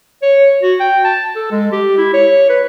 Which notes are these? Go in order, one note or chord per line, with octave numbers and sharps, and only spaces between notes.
C#5
F#4
G5
A5
A4
G#3
G4
E4
C#5
B4